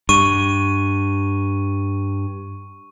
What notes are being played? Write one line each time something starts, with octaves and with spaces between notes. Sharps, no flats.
G2 C#6 D#7